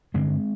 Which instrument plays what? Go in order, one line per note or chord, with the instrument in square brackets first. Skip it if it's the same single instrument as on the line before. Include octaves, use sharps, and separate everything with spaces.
[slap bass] G2 D3 G#3 C4